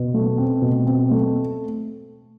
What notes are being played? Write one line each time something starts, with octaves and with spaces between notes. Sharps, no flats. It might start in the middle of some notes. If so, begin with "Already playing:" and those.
Already playing: B2
A3
C4
B2
C4
A3